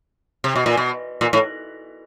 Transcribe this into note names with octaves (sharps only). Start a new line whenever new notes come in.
C3
B2
A#2
B2
A#2
A2